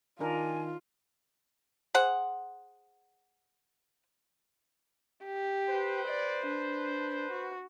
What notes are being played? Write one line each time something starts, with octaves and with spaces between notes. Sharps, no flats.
D#3 D4 F4 A#4 G#5
G#4 C5 F#5
G4
B4 C5
D5
D4
F#4